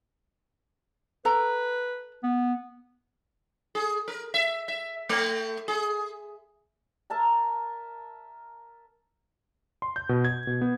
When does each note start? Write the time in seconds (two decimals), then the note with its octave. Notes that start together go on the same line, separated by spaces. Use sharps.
1.25 A4 B4 A#5
2.23 B3
3.75 G#4
4.08 A#4
4.34 E5
4.68 E5
5.09 A3
5.68 G#4
7.10 A#4 E5 A5 A#5
9.82 C6
9.96 G6
10.09 B2
10.25 G#6
10.47 B2
10.62 B3